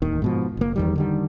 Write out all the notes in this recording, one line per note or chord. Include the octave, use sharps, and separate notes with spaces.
D1 D#2 D#3
G#2 B2 F3
F#1 A#3
E2 D#3 G3
D3 D#3 G3